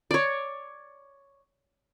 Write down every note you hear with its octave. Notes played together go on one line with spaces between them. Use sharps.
C#5 D5